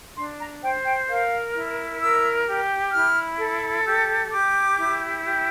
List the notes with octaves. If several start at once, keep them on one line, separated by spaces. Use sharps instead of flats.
D4 C6
A#5
C5 G5
G5
A#4 F5
E4
A#4 E6
G4
E4 F6
A4
G4 E6
G4 D6
E4
G4